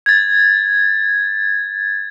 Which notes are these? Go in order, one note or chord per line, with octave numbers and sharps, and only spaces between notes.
G#6 A6